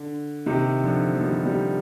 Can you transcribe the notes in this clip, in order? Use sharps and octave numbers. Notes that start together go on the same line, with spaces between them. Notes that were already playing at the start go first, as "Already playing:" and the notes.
Already playing: D3
C3 D#3
D3 F3
F3
D#3 G3
D#3 G3